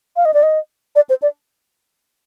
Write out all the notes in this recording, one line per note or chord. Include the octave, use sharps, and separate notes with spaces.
F5
D#5
D5
D#5
D5
C5
D5